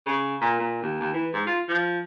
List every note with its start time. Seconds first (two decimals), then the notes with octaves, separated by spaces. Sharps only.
0.07 C#3
0.41 A#2
0.59 A#2
0.82 D#2
1.00 D#2
1.13 E3
1.33 G#2
1.47 F4
1.68 F3